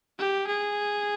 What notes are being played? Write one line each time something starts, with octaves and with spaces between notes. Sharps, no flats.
G4
G#4